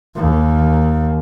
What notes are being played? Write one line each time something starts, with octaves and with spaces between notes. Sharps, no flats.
D#2